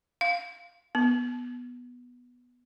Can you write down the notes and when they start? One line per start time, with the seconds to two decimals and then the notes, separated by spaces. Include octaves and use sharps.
0.21 F5
0.95 B3